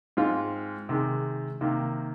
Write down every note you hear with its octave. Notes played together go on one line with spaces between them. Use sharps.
G#2 G#3 C4 F4
C3 D#3 G#3
C3 D#3 A#3